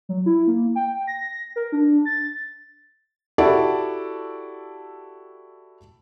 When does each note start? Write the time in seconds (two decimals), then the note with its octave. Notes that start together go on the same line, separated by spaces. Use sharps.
0.09 F#3
0.26 E4
0.47 A#3
0.76 G5
1.07 A#6
1.56 A#4
1.72 D4
2.05 A6
3.38 E4 F#4 G4 A4 D5